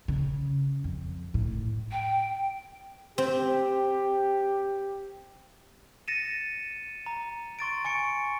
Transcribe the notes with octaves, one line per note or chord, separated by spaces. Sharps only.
C#3
F2
A2
G5
C4 G4
A6 A#6 C#7 D#7 E7
A#5
C6 C#6 A6 D7
G#5 C#6 C#7 D7